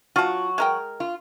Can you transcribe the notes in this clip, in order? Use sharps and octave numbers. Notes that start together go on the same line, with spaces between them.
F#3 F4 F#4 A5
G#3 A#4 G5
F4